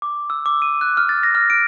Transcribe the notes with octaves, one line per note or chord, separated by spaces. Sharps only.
D6
E6
D6
D#7
F#6
F6
A6
A#6
F6
D7